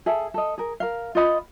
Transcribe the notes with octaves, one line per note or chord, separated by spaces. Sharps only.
G#4 A4 E5
A4 D#5
G#4 A#4
A#4 F5
F4 C5 D#5 B5